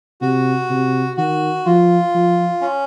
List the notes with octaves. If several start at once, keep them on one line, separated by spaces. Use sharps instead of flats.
C3 F#4
C3
D#3 F#4
F3 F4
F3
C#4